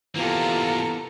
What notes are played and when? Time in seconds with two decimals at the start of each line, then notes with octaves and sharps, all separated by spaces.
0.16 C3 E3 A#3 B3 F4 G4 A4 A#5